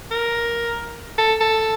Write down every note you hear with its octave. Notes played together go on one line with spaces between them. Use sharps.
A#4
A4
A4